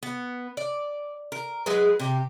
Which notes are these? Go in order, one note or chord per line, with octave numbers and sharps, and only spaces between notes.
B3
D5
A#4
F#3 G#3 G#4 B4
C3 G4